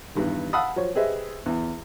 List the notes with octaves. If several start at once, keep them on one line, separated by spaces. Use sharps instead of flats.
E2 G2 D#3
F5 F#5 A5 B5 D#6 E6
F3 F#3 C#5
G4 G#4 B4 C5 D#5 E5
E2